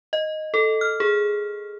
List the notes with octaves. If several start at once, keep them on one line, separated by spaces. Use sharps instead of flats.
D#5
A4
F6
G#4